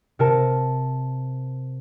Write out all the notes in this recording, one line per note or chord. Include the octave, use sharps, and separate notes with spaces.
C3 A#4 A5 C#7